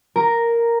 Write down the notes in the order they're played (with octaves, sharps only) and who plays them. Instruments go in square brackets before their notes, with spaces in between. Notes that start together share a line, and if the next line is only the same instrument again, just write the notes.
[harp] A#4